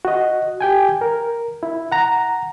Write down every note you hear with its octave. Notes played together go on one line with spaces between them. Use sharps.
F#4 D#5
G4 G5 G#5
A#4
E4
F#5 A#5